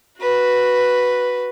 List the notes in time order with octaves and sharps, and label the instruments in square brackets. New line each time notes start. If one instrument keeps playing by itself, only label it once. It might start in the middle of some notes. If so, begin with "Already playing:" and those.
[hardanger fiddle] F#4 B4